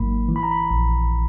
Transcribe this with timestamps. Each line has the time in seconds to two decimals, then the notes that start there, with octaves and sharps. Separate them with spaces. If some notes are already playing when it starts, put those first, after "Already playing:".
Already playing: G#1 G#2 F#3 A#3 B5
0.29 E3
0.36 B5
0.43 A#5
0.51 B5
0.71 A#1